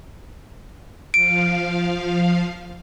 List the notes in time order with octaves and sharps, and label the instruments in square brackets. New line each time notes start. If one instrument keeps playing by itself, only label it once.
[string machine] F3 F5 [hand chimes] D7